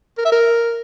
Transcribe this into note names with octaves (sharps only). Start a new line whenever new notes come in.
A#4
E5
A#4